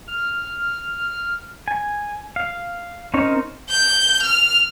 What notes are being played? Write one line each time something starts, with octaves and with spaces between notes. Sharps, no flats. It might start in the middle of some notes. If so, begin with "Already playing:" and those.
F6
G#5
F5
C4 C#4 D#4 A#4 C#5
G6
F6